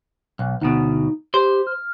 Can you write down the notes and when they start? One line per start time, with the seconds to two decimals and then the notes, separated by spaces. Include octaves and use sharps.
0.39 B1
0.61 D2 B2 D#4
1.34 G4 C5
1.67 F6